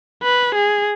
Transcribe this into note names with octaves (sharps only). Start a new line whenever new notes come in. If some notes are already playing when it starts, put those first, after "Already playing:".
B4
G#4